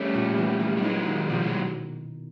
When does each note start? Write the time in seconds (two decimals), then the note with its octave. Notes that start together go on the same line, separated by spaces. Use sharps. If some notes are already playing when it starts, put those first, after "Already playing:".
Already playing: G3 A3 C#4
0.15 A#2
0.37 E3
0.60 E3
0.77 G3
0.83 F#3 G#3 D#4
1.06 D#3
1.29 B2 F3 G3
1.44 F#3 G#3